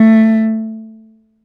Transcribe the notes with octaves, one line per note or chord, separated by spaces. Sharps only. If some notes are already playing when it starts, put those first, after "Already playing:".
Already playing: A3